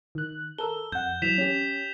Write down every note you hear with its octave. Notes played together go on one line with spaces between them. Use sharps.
D#3 F#6
A4 A#4 E6 G7
F2 F#5 G6
E3 F#3 B6 E7 F7
C#4 G4